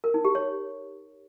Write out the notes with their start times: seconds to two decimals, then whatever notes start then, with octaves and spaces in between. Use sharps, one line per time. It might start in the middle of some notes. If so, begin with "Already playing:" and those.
0.04 A#4
0.14 D#4
0.25 G4
0.35 C#5